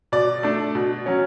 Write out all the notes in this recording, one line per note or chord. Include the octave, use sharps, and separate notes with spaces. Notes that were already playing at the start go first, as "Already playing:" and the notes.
B2 D5
A3 D4
B2
F#3 C#4